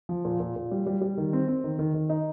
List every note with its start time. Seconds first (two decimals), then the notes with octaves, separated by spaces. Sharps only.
0.09 F3
0.25 A#2
0.40 A#2
0.56 A#2
0.71 G3
0.87 G3
1.01 G3
1.17 D#3
1.33 C4
1.48 C4
1.64 D#3
1.79 D#3
1.94 D#3
2.10 D#4